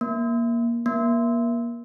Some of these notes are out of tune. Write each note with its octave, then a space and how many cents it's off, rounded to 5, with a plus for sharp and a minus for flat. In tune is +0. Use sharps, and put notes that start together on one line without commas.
A#3 +15
A#3 +30